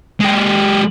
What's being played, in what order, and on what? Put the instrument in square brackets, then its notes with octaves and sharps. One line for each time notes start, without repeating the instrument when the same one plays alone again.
[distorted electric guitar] G#3 G4